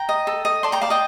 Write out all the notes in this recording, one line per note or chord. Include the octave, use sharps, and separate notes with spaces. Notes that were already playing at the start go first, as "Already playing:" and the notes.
Already playing: G5 A#5
D#5
A4
D#5
D5 A5 C6
G5 A#5
D5 F5 A5
D#5 G5